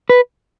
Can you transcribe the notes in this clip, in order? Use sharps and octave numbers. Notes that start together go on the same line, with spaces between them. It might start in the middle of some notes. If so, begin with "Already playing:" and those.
B4